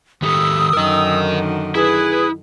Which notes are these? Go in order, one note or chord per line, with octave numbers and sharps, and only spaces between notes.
D#3 G4 A4 D#6 E6
F#2 D3 D#3 A#4 D#5
E4 G#4 B4 D#6